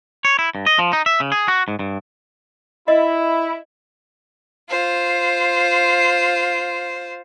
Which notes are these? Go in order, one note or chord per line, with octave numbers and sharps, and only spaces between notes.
C#5
E4
G2
D#5
F3
D#4
E5
C#3
G#4
F#4
G#2
G2
E4 D#5
F4 C5